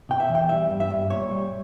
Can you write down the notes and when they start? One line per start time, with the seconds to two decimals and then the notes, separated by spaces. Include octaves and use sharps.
0.09 B2 G5
0.20 E5
0.29 E2
0.35 G5
0.49 G3 E5
0.70 G2
0.80 E5
0.90 G2
1.10 A#2 C#5
1.31 G3